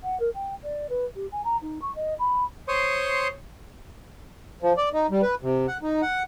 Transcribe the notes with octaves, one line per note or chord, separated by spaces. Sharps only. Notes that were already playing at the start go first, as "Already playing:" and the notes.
F#5
A#4
G5
D5
B4
G4
G#5
A#5
D#4
C#6
D#5
B5
C5 C#5 C6 C#6 D#6
F3
D5
D#4
G3
B4
C3
F#5
D#4
F#5